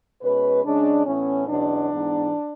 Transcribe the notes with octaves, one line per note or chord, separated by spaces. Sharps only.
B2 G#3 C#4 B4
C#3 G#3 C#4 D4
A2 E3 B3 C#4
E2 B2 F#3 C#4 D4
G#2 E3 B3